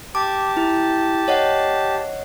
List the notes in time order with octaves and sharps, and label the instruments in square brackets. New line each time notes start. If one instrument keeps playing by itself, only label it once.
[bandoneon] G4 A5 [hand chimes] D6
[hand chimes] E4
C#5 D#5 F#5